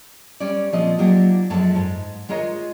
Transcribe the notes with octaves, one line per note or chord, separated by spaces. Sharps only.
G3 C#4 G4 D5
A#2 F3 C4 D#5
F#3 A#3 D4 D#4 F4 G4
F#2 F3 G#3 A4 A5
G#2
G#3 F4 A#4 C#5 D#5